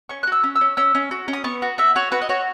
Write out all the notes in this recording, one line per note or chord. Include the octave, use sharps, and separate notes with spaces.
C#4 C#6
F#6
F#4 E6
C#4
E6
C#4
C#4 E6
C#4
F#4
C#4
D#6
B3 C#6
F#4
F#4 E5
F#4 C#5
F#4 B4
D#5
F#4 C#5